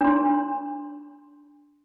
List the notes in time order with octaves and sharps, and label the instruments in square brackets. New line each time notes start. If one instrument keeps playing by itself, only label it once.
[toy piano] D4 C6